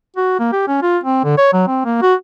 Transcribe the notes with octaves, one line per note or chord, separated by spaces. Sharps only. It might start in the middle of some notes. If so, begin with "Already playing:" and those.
F#4
A#3
G4
C#4
F4
C4
D3
C#5
F#3
C4
A#3
F#4